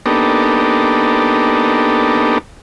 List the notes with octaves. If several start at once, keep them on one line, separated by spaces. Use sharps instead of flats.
A#3 B3 D4 D#4 G4 A4